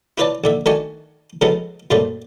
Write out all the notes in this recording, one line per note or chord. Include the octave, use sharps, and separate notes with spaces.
E4 F4 B4 C#5 D5 A5
A#1 D3 E5
D#3 A3 D4 F#4 G#5 C#6
C#3 F3 G#3 B3 F#4 A4
F#2 A#2 C#3 G3 A3 C4